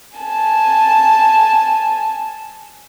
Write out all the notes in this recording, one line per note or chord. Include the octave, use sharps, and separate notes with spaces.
G#5 A5